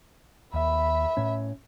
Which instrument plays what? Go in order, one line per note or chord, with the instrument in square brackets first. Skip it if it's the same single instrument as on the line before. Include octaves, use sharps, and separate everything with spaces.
[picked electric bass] D#2 [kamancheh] E5 B5
[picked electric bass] A2 C#4